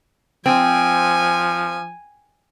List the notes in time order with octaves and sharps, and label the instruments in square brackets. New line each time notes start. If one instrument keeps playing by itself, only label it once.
[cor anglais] F3 [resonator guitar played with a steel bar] C4 [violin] G#5